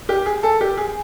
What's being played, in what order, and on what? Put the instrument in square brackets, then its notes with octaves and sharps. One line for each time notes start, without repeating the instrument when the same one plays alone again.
[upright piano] G4
G#4
A4
G4
G#4